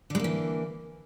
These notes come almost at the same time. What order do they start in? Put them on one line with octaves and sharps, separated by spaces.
D3 G#3 A#3 E3